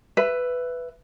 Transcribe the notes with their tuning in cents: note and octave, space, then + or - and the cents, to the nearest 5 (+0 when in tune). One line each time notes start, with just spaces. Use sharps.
B4 +5 E5 +15